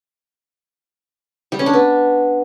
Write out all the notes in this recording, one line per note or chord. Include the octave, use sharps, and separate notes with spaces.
G3
C#4
D4
B3